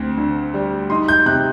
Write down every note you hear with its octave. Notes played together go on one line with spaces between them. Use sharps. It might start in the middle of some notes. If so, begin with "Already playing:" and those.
Already playing: D2 C4
D3
G3
D#4 C6
G6
C3 F#6